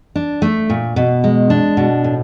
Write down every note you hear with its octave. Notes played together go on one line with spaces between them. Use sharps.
D4
A3
A#2
B2
G#3
D4
B2
A2